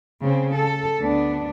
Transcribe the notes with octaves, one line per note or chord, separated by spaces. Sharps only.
C#3 C4
A4
D2 B3 D4